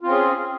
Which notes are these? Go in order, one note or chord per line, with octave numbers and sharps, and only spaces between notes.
C4 C#4 F4 G#4